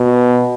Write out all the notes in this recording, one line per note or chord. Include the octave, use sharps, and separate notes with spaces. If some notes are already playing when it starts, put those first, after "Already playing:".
Already playing: B2